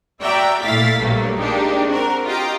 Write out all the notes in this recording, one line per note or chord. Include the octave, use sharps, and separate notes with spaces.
F#4 D5 E5 G5 A#5
A#2 A3 E4 F5 A6 B6
A#1 G2 F#3 A3 A#3
G#3 A#3 D4 D#4 G4
C4 D4 F#4 A#4
F4 G4 D#5 G5 A#5